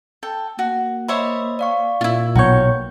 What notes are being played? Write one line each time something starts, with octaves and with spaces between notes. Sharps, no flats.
A4 G5
A#3 F#4
C5 C#5 D#5 E5 B5
D5 F5 C#6
A#2 E4 F4
B1 B3 F#4 C#5 G5 G6